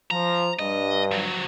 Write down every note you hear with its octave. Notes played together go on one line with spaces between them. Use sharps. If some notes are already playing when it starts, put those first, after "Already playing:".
F3 A#5
G2 D#5
F3 F#3